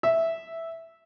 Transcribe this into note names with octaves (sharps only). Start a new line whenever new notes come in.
E5